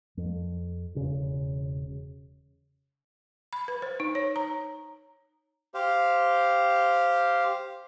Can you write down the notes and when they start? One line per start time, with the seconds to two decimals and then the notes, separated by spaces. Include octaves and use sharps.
0.17 F2
0.95 E1 C#3
3.53 B5
3.68 B4
3.82 C5
4.00 D#4
4.15 C#5
4.36 A#5
5.74 G4 C5 F5